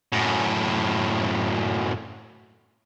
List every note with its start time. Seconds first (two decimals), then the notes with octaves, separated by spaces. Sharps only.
0.12 F#2 A2